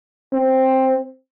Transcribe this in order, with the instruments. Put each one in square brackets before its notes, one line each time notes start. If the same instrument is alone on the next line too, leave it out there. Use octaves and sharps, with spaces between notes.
[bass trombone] C4